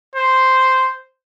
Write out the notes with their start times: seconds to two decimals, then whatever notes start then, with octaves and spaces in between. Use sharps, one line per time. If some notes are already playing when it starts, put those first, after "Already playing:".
0.15 C5